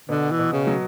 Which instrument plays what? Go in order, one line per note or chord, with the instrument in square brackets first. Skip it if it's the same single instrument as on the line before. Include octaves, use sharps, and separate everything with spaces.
[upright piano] B2 [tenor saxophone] D3
[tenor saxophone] E3
[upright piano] B2
[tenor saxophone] C#3
[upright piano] F#3